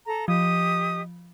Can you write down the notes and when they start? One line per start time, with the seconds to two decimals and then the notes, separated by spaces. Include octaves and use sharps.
0.07 A4 A#5
0.28 F3 G4 D#5 D#6